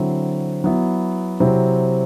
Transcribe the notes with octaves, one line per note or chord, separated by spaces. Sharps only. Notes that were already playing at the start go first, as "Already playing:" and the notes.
Already playing: D3 F#3 C4 E4
F#3 B3 E4
C3 F#3 C4 E4